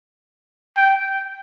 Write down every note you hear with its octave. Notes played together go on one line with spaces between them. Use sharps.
G5